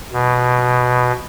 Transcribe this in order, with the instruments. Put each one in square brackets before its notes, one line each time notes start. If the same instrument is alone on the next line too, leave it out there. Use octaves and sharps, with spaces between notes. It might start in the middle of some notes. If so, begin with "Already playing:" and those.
[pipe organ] B2